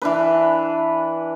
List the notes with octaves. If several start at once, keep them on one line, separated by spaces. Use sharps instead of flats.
E3 D4 B4